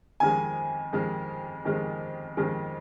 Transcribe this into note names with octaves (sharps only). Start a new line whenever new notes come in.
F2 D#3 G#3 G#5
F2 D#3 G#3
F2 D#3 G#3
F2 D#3 G#3